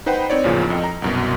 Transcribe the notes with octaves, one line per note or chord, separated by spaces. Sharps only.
D#4 B4 C5 F#5 G5 B5
C4 D#4 C#5 D5
A1 E2 A#2 C#3 F3
F2 D#5 G5
A#5
C2 F#2 B2